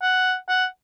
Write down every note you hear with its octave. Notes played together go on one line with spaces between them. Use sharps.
F#5
F#5